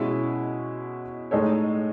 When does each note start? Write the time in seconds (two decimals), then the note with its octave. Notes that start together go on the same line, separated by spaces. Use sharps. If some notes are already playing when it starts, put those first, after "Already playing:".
Already playing: B2 G#3 C#4 E4
1.31 A2 G#3 D#4 A4 C#5